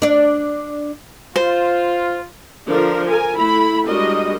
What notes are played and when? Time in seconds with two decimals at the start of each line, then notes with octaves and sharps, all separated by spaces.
0.02 D4 D5
1.36 F4 C5
2.68 D3 F3 D4 A#4
3.09 A#4 G#5
3.38 A3 E4 B5
3.88 G3 G#3 D4 F#4 A#4 D#5